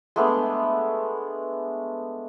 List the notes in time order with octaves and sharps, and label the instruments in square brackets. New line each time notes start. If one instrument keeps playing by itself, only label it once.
[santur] G#3 A3 B3 D4